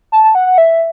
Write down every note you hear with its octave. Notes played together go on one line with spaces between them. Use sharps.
A5
A5
F#5
F#5
E5